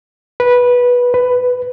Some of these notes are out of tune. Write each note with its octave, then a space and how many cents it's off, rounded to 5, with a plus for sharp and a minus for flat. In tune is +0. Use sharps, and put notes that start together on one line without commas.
B4 -15
B4 +10